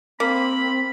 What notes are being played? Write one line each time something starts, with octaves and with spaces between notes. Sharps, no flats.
A#3 C4 B5